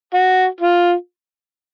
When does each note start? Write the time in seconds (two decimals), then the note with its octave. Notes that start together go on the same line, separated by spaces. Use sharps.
0.14 F#4
0.61 F4